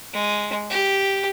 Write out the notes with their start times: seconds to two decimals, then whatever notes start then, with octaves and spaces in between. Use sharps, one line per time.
0.13 G#3
0.70 G4